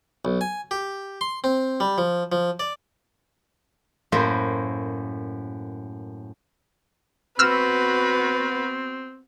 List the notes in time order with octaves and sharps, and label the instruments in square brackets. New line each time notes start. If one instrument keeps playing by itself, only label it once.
[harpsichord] B1
G#5
G4
C6
C4
G3
F3
F3
D5
[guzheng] F#2 A2 A#3 C5 B5 C6
[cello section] B3 F#4 [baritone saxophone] C4 [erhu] B4 [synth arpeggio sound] E6 F6